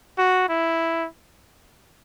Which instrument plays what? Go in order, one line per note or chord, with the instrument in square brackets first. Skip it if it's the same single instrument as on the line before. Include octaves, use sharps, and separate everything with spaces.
[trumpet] F#4
E4